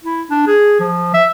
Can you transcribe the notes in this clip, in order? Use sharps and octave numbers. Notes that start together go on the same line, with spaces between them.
E4
D4
G#4
F3
E5